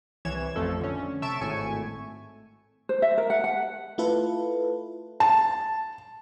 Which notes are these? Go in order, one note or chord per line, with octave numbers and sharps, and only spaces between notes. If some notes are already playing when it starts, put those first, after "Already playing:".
C2 E3 C#5 G#6 E7
A1 F2 F3 A3 A4
D3 C#4
C3 E5 A5 C#6 D7 E7
G#1 A2 A3 G#5 C#6
C5
E5
A#4
F#5
F#5
A3 E4 F4 A4 B4
A5